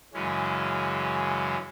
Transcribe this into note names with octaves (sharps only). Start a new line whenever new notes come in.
F#2 C#3 E3 G#3 C#4